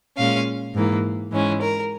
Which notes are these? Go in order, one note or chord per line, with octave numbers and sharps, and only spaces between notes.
A#2 G#3 C#4 F5
G#2 E3 A#3
G#2 E3 G#3 C#4
A#4